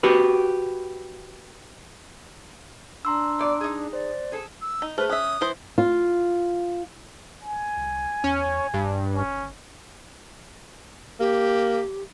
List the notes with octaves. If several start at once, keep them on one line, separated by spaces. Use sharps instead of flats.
F#4 G4 B4
D4 A#5 C6 E6
B2 D5
D#4 G#4
C5 D5
G#4 A4
E6
D#4
A3 G#4 B4 C5 F6
C#4 E5 D#6 F#6
E3 C5
F4
G#5
C2
E2 C#4
E1 G2
G1 C#4
A#3 G4